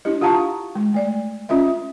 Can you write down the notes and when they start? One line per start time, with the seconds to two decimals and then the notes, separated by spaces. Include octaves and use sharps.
0.05 D4 E4 G4 D#5
0.21 F4 F5 F#5 A5 A#5 C#6
0.75 G#3
0.94 A3 D5
1.49 C#4 F4 D#5 E5